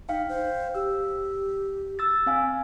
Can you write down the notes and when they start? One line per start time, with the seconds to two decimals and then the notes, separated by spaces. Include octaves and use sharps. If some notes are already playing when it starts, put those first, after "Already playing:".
0.09 D#4 F5 G5
0.29 C5
0.74 G4 E6
1.99 E6 A6
2.26 C4 F5 G#5